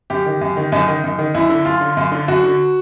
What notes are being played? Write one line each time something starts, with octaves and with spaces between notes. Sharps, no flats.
F#2 G4
D#3
F#2
D#3
F#2 D#4
D#3
F#2
D#3
F#2 E4
D3
F#2 F4
D3
F#2
D3
F#2 F#4
D3